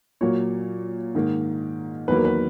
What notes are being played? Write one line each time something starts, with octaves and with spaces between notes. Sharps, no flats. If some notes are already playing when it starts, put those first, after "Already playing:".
A#2 F#3 A#3 C#5
G#2 D#3 A#3
E2 D#3 F#3 A#3 B4
A#4
B4